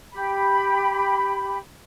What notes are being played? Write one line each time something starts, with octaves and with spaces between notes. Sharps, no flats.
G4 B5